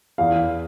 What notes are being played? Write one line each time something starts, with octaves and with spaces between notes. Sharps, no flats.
E2 F5